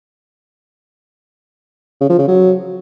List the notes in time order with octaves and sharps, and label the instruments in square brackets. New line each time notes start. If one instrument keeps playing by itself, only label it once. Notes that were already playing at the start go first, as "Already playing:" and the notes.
[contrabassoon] C#3
F3
C#3
F#3